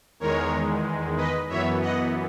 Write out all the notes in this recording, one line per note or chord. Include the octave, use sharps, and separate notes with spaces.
E2 D#3 G#3 A#4 C#5
B4 D#5
F#2 E3 B3 C#5 E5
D#5 F#5